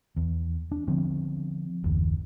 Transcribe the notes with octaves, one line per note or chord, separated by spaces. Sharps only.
E2
D4
D3 F3 B3 C4
F#1 D#2